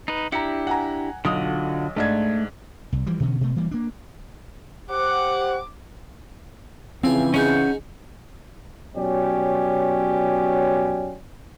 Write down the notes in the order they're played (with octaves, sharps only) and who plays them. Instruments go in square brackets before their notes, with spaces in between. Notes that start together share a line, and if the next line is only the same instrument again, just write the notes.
[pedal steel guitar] D#4 B4
[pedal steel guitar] D4 E4 G4 [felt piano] A#5 C#7
[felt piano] F#5 G#5 A#5
[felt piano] B1 D#6 [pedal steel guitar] D3 F4 F#4
[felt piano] G#2 D4 G#6 [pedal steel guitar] A3
[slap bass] C2
E3 F3 G3
B2 D3 E3 C#4
B2 A3
E3 G3 A#3
A#3 D4
[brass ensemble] G4 C5 F#5 [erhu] D6
[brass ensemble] C#3 E3 [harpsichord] F3 G#5 [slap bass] C4
[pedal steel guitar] C#4 F#5 G6 [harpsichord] D#4 G#4
[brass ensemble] B2 F#3 C#4 G4 C#5 D5